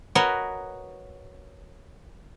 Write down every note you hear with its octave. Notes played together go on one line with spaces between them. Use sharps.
F#4 A#4 B4 C#5 D#5